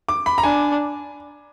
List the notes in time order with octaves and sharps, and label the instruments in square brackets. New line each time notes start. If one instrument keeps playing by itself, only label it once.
[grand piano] D6
B5
A#5
[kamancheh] D4 [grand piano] G#5